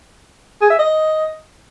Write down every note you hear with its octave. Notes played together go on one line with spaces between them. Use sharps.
G#4
E5
D#5